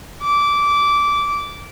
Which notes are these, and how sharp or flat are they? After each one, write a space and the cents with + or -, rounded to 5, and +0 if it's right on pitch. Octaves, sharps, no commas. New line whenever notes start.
D6 -15